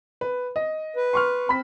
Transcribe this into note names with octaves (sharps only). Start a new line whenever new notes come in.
B4
D#5
B4
C6 C#6 F6
C4 B5 B6